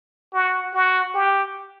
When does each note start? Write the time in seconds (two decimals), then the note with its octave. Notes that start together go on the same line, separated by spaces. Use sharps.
0.34 F#4
0.74 F#4
1.14 G4